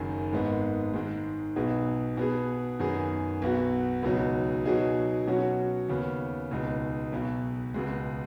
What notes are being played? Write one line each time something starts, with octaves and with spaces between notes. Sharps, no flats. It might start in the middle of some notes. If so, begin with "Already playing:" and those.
Already playing: F#1 F#2 D#3
G#1 G#2 G#3 B3 D#4
G#2 D#3 G#3
B1 B2 B3 D#4 G#4
B2 B3 G#4
F#2 D#3 B3 G#4
B1 B2 B3 F#4
C#2 B2 F#3 D#4
B2 F#3 D#4 G#4
B2 F#3 C#4 F#4
D#2 C#3 B3
C#2 B2 G#3 D#4
B1 B2 B3
C#2 B2 G#3